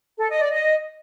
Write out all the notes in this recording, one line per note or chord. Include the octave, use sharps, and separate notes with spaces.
A4
D#5
D5
D#5